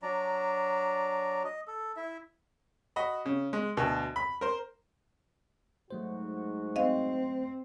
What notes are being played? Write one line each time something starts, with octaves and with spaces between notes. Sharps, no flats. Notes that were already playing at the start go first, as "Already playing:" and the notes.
F#3 D4 D5 A#5
D#5
A4
E4 E5
F#4 D#5 B5
C#3
G#3
D2 B2
B5
A#4 C5
G#2 F#3 A3 F#4 C5
C4 D#5 F5